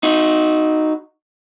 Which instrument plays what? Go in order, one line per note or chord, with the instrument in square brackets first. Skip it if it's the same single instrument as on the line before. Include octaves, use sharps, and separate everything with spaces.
[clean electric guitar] D#4 F#4